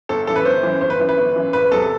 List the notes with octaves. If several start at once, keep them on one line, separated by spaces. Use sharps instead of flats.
G1 A4
F#2 E3 A4
B4
G1 C5
F#2 E3
G1 C5
B4
F#2 E3
B4
G1
F#2 E3
F#1 B4
E2 C3 F#3 A4